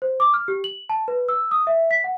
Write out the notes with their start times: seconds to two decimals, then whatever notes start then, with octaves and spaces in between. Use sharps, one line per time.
0.02 C5
0.20 D6
0.34 F6
0.48 G4
0.64 F#7
0.90 A5
1.08 B4
1.29 E6
1.51 D#6
1.67 E5
1.91 B6
2.04 F#5